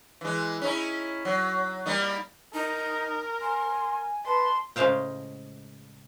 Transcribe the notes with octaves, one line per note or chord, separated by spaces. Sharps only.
E3 G#3
C#4 D#4 E4
F#3
G3 A#3 D#4
D#4 A#4
G#5 C6
B4 A5 C6
A2 C#3 G#3 C5 F5 G5